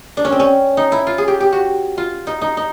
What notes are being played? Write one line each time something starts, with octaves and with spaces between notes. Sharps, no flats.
D4
C#4
C4
C#4
D#4
E4
F4
G#4
G4
G4
F#4
F4
D#4
D#4
D#4